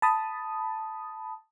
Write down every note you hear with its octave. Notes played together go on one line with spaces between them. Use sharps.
A5 B5 D#6